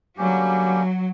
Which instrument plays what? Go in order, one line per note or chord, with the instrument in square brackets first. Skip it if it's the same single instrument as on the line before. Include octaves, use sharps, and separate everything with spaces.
[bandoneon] D3 G3 A#3 C#4 G4 [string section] F#3